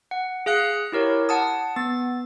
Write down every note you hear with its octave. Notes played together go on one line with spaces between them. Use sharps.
F#5
G#4 F5 F#6 C#7
E4 G4 A#4 C#5
F#5 A5 D#6
B3 A6